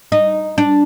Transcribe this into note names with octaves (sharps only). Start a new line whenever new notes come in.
D#4
D4